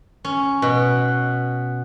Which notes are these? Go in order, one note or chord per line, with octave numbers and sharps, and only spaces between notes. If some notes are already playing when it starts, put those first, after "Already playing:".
C#4
B2